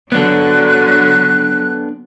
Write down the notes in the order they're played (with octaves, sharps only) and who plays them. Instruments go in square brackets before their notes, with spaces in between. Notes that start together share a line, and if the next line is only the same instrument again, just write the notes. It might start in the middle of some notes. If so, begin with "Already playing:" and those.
[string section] D3 F#3 [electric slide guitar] B3 D4 A4 [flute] F#6